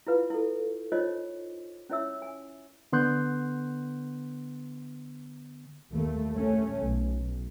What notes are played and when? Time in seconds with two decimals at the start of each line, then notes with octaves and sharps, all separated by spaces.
0.07 E4 F4 B4 F5
0.30 E4 A4
0.92 D#4 F4 C5 C#5 D#5
1.90 C#4 E4 C#5 E5 E6
2.22 G#5
2.92 D3 B3 C6 F#6 G6
5.91 D#2 A3 A#3
6.34 A3 C#4
6.79 B1